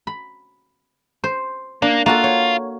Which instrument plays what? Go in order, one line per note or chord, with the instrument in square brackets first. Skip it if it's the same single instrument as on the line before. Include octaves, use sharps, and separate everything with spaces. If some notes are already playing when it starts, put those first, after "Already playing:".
[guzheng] B5
C5
[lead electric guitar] A#3 [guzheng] D4
[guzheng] A#3 F#4 A4 [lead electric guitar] F4
[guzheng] C#5